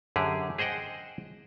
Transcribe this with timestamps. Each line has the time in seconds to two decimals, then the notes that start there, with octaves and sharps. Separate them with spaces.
0.16 F#2 D3 G4 G#4
0.59 G#4 C5 D#5 F#5 G5